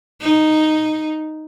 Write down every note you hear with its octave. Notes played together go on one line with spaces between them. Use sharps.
D#4